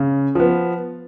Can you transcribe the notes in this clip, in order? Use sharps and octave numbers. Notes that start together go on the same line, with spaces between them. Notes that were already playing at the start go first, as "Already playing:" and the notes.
Already playing: C#3
F3 B3